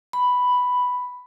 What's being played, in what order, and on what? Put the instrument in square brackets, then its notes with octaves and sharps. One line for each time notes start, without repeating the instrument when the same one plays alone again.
[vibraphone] B5